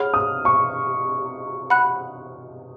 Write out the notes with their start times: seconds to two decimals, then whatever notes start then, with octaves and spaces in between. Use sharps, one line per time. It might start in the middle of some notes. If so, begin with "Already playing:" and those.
Already playing: G#4 C#5 F#5 B5 F6
0.14 D#6
0.45 C#6
1.70 F#5 B5 F#6